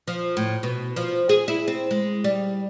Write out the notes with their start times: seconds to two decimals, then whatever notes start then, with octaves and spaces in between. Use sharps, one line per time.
0.08 F3
0.37 A2
0.63 B2
0.96 F3
1.29 G#4
1.48 E4
1.68 C4
1.91 G#3
2.24 G3